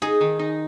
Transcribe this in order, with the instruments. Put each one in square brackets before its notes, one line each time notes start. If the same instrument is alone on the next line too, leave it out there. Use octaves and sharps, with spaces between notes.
[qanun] D#4 [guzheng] G#4
[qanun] D#3
D#4